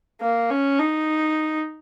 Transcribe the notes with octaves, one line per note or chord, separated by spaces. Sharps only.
A#3
C#4
D#4